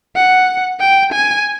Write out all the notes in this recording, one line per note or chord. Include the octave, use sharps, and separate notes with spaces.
F#5
G5
G#5